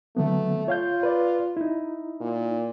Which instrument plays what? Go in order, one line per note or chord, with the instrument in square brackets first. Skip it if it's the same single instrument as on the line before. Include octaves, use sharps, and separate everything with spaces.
[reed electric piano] D3 F#3 B3 [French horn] A3
[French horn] F4 [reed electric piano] C#5 F5 G6
[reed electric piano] B4 D5
D#4 E4
[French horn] A#2